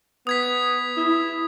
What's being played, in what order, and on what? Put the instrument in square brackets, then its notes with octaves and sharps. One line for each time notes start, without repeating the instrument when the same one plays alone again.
[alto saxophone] B3 [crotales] D#6 G#6 B6
[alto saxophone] E4